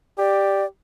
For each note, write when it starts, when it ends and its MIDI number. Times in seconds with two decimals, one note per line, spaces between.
0.18 0.67 67
0.18 0.65 74